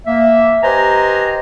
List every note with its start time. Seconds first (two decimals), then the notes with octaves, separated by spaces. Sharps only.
0.07 A#3 E5
0.63 G4 B4 C5 D#5 G#5 A#5